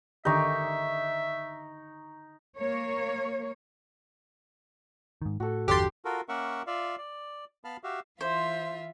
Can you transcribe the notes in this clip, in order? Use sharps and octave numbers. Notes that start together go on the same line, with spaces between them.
D3 D#3 D#4 G4 E5 C#6
A#3 C#5
G#2 D#3
A2 F#4 A4
G1 E2 D4 G4 A4 C6 D6 A6
F4 F#4 A4 A#4
A#3 C#4 A#4 E5 F#5 C#6
F4 D5 E5 F5
D5
B3 F5 A5 B5 F6
F#4 G4 E5 F5
E3 F4 C5 E5